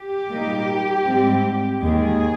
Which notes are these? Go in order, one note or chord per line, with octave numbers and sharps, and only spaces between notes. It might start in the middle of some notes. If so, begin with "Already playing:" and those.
Already playing: G4
A#2 G3 A#3 D#4
G#2 G3 C4
D#2 D#3 G#3 G#4